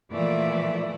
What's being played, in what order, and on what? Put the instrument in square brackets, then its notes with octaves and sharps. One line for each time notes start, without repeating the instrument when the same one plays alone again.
[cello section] A#2 E3 F3 A3 E4 D5